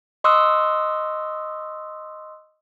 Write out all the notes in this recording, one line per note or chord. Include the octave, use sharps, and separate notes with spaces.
D#5 C6 C#6 D#6 E6 F#6